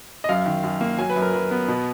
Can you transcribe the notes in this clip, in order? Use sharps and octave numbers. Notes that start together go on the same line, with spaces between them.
D#5
F#2 F5
D#3
F#2
A#3
F#3 G#5
B4
F#2
A#4
F#3 B4
B3
B2